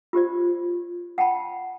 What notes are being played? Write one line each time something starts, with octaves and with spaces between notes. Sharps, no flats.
F4 G4 C5 D5
F#5 G5 A5 B5